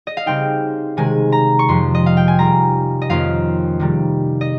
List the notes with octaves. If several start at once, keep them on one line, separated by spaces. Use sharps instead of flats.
D#5
F5
C#3 G3 C4 D#4 G5
C3 D#3 G#3 G#5
A#5
C#6
F2 C3 F3 C6
D#5
F5
G5
G#5
D#3 G3 C4 F4 A#5
D#5
F2 D#3 A#3 C#4 F4 F5
C3 D#3 G3
D#5